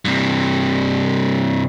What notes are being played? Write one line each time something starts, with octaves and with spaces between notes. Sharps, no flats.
G2 C3